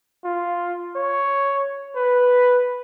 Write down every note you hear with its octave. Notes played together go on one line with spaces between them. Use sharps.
F4
C#5
B4